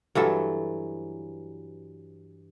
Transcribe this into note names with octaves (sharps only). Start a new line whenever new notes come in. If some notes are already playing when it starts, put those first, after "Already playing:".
G2 E3 F#3 A4